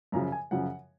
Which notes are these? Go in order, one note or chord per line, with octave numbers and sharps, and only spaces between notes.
F#2 C#3 F3 A#5
G#5
F#2 C#3 F3 F#5